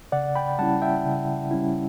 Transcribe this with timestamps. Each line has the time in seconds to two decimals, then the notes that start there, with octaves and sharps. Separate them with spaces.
0.12 C#3 D5 F#5
0.35 G5 B5
0.59 G3 C#4 E4 F#5 A5
0.82 E5 G5
1.06 C#3
1.51 G3 C#4 E4